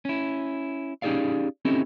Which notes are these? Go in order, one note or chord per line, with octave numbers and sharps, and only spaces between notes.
C#4 E4
C#4 D#4 G4 G#4 D5 F5
C4 C#4 D#4 E4 G4 A4